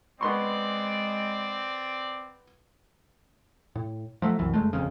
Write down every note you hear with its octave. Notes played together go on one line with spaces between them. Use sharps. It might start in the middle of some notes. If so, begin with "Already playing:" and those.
G#3 B3 C4 D5 C6 C#6
A2
F3 F#3 A3
C2 F#2 E3
F#1 G#3 A3
F#1 F2 C#3